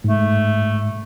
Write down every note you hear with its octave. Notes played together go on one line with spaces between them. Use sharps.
G#2 A3